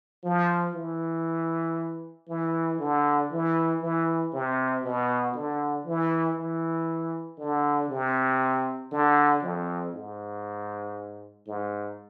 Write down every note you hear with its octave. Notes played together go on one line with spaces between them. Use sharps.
F3
E3
E3
D3
E3
E3
C3
B2
D3
E3
E3
D3
C3
D3
F2
G#2
G#2